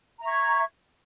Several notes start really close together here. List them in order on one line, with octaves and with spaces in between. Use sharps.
A#5 E5 C#6 G#6